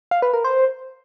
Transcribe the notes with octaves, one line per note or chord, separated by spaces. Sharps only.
F5
B4
A#4
C5